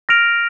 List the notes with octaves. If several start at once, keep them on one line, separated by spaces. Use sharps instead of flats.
F6 A#6 D7 F7